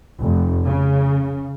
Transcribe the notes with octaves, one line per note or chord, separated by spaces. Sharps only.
F1
C#3